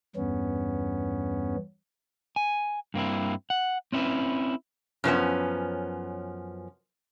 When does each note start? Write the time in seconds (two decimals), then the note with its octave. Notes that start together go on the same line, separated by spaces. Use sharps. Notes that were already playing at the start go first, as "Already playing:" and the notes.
0.16 E2 G2 B3 C#4
2.36 G#5
2.94 G2 A#3 C4 E4
3.50 F#5
3.92 C4 C#4 E4 B4
5.04 F#2 F3 B3 C#4